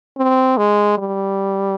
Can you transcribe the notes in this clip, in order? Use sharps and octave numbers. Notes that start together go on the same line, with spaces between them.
C4
G#3
G3